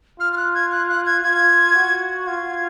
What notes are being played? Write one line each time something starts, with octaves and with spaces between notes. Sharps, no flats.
F4 F6
F6
F#6
G#6
F#6
F#6
G#6
F4 G#6
F#4
F4 G#6